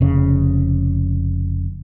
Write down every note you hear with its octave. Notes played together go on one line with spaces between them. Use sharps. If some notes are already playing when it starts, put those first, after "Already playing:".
F1 C#3